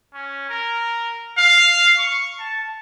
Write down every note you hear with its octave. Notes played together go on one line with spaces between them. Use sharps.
C#4
A#4
F5
C#6
A5